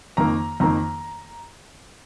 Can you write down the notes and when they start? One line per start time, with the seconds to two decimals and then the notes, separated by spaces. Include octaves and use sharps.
0.17 F2 D#3 A#3 A#5
0.60 F2 D#3 A#3 A#5